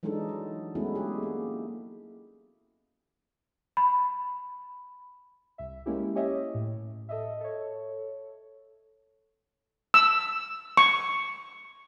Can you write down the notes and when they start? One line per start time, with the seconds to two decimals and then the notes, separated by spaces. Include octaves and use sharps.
0.03 E3 F#3 G#3 D4 D#4 A4
0.29 F#3
0.75 G#3 A3 B3 C#4 E4 F#4
0.95 G#3 G4 G#4
1.23 A#3
3.77 B5
5.58 C2 E5
5.86 G#3 A#3 C#4 E4 G4
6.15 C#4 G4 C#5 D#5 E5
6.54 A2
7.09 A4 D#5 E5
7.41 A4 C#5
9.94 E6
10.77 C#6